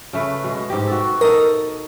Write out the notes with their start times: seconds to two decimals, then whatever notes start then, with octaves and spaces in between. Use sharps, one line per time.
0.13 C#3 A3 B4
0.44 B2 G#3
0.70 G#2 G4
0.87 F#4 A4
1.21 D#4 A4 A#4 D#5